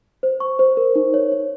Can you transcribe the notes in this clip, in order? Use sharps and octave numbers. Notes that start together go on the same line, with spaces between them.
C5
C#6
C5
A#4
D#4
C#5
C#5